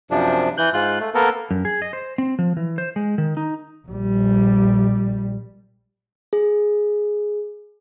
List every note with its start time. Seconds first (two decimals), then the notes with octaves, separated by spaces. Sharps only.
0.11 F#2 C3 F3 D4
0.58 E3 F#6 G6
0.73 G#2 F4 F#6
1.00 A3
1.15 A#3 B3 A4 A#4
1.51 F#2
1.65 G#4
1.82 D#5
1.93 C5
2.18 C4
2.39 F3
2.57 E3
2.78 C5
2.96 G#3
3.18 D#3
3.37 D#4
3.87 A#1 G3
6.33 G#4